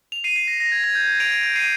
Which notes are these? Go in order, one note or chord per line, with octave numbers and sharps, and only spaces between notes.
F7
C7 D#7
C7
A#6
A#6
G#6
G#6
G6
G#6
D7 F7
D7 F7
D7 F7
C7 D#7